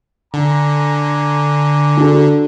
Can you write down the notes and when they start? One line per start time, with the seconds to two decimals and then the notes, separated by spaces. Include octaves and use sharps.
0.34 D3 G#5 A#5 D6
1.97 D4 F#4 A4